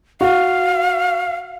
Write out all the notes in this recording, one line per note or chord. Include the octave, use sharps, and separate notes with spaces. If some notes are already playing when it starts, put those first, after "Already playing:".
F#4 F5